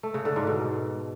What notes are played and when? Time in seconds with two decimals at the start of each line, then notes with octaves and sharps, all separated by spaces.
0.03 A3
0.14 C#3
0.25 D3
0.36 G#2
0.47 B2